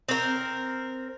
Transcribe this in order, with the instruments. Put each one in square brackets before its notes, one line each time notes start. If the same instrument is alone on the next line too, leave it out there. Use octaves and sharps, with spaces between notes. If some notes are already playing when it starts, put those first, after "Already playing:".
[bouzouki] C4 A#4